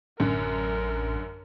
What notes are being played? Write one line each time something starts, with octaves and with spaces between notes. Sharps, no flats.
A1 F#2 D3 A#4